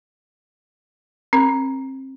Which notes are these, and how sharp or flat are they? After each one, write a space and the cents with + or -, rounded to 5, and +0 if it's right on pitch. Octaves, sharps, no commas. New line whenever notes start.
C4 +30 A#4 +0 B5 +0